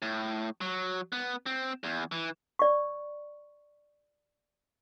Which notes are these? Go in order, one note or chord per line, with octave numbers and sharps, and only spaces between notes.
A2
F#3
B3
C4
E2
E3
D5 C#6